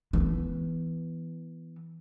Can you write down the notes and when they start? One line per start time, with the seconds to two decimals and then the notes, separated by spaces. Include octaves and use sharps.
0.13 E3 B3